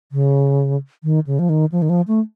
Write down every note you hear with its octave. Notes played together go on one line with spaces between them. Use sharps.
C#3
D#3
C#3
F3
D#3
F3
D#3
F3
A3